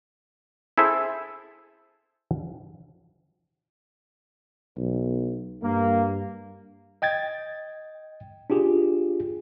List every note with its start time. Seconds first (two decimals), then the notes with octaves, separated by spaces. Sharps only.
0.78 E4 G#4 A4 C5 E5
4.77 B1
5.63 G2 A#3
7.02 D#5 G5 G#6 A6
8.50 D4 F4 G4 G#4